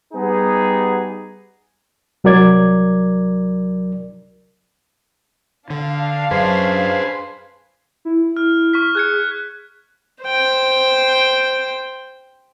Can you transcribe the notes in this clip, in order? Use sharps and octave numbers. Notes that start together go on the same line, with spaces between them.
G3 B3 D#4 G4 G#4
C2 F#3 A#4 D5 G#6
D3 D4 F5
F#2 G#4 B4 C5
E4
F6
C#6 F6 B6
G#4 F#6 G#6 C#7
C5 G5